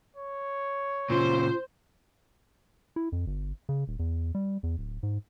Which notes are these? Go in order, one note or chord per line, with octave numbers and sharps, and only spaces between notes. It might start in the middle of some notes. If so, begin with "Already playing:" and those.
C#5
A#2 C#3 F4 C5
E4
F2
G1
C#3
D#1
E2
G3
E2
D1
G#2